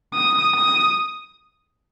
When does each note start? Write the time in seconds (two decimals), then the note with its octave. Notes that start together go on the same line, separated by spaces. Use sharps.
0.14 D#6
0.55 D#6